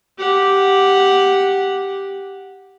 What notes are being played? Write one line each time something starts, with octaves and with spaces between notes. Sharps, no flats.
G4 F#5